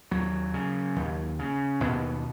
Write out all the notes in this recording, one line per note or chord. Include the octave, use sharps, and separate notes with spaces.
D#2 F#3
C#3
D#2
C#3
D#2 B2 B3